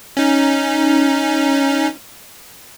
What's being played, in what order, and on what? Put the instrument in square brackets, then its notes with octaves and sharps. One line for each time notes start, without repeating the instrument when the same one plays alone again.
[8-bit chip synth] C#4 D#4